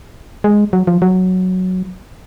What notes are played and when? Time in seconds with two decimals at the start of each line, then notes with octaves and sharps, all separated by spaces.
0.44 G#3
0.73 F#3
0.87 F3
1.02 F#3